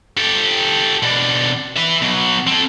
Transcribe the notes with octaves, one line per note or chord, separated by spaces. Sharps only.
G4 A4
B2 D4
B4 E5
B2 F#3
C4 A4